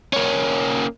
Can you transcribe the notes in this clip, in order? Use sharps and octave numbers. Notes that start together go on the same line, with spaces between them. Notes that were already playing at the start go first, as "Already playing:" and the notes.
A#3 C#4